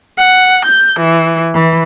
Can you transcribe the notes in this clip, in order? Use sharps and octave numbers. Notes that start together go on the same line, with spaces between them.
F#5
G6
E3
E3